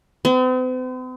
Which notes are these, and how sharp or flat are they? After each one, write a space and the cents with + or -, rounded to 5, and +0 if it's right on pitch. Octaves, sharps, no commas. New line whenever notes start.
C4 -45